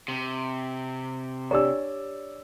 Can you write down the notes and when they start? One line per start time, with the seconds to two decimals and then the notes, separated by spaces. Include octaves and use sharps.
0.08 C3
1.51 D4 G4 C#5 D5 A#5 E6